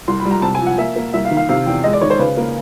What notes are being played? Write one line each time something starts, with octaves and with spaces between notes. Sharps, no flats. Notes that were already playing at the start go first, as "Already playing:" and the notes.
C2 C6
B5
G3
A#5
C3 A5
G#5
F3
F#5
A#3 E5
A#3
C2 E5
F5
D#3
F5
C3 F5
E2 G5
G#3 D#5
D5
D#3 C#5
C5
C#3 B4
A#3